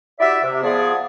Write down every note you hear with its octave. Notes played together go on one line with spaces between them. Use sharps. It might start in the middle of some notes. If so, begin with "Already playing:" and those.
E4 F#4 G4 D5 E5
C3
F3 B3 G#4 D5